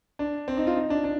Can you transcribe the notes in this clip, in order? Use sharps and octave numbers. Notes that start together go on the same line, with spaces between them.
D4
C4
D#4
F4
D#4
D4
D4